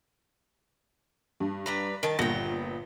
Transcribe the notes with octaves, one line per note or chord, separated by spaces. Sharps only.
G2
G3 B4 A#5
D#3 A5
G1 A#2 B3 G5 A#6